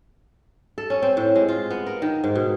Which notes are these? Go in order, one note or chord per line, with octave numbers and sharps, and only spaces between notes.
A4
C#4
C4
A2
G#3
F4
B3
A#4
D#3
G#2
B2